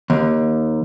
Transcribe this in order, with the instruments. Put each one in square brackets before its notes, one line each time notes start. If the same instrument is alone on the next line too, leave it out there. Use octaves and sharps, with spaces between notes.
[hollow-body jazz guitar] D#2